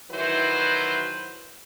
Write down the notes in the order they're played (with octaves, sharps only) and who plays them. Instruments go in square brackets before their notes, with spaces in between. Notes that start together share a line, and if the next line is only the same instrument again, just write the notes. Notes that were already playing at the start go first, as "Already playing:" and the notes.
[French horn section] D#3 E3 F#3 E4 B4 C5